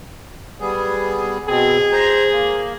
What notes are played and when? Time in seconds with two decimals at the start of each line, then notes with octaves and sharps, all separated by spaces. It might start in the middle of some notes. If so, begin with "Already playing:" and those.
0.60 G3 B3 G#4
1.48 B2 C4 G#4
1.92 C5 A#5
2.32 A#3